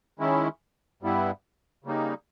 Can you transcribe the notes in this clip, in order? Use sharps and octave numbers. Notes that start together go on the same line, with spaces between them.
D#3 G#3 C#4 E4
G2 G3 B3 E4
C#3 G3 A#3 D#4